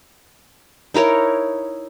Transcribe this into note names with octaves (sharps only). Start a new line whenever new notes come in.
D#4 E4 A#4 C#5